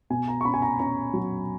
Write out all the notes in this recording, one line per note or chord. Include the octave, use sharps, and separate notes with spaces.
B2 G#5
A#5
C#6
C#4 B5
G#5
A#5
C#4 A#5
F#3